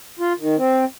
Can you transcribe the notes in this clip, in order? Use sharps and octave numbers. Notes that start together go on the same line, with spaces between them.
F4
D#3
C4